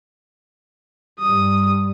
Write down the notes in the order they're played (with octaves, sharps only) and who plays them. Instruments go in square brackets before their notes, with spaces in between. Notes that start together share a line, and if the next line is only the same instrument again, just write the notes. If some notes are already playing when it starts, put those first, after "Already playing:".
[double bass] G2 G3 [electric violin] D#6